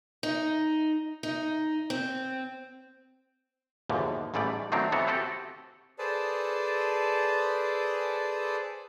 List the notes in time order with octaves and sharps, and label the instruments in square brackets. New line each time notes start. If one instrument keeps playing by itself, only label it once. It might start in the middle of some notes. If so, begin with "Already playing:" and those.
[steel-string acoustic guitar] D#4
D#4
C4
[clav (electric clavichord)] D#2 G#2 B2 D3 E3 F3
A1 G#2 E3 G3 A3 D5
D#3 F#3 A3 C4 D4 A#4
E3 B3 C4 F#4 A4 C#5
C4 F#4 G4 A4
[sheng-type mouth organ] G#4 A4 B4 C5 D5 A5